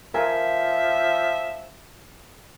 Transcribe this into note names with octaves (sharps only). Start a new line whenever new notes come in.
F3 A#4 E5 F5 G#5